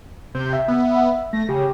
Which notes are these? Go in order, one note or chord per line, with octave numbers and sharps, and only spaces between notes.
C3 G6
E5
B3
A3 A#6
C#3 G4